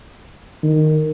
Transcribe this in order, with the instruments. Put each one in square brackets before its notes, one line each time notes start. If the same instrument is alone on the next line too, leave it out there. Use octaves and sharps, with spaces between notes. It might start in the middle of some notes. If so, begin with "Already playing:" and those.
[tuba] D#3